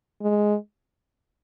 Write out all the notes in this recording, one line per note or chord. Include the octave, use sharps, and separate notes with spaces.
G#3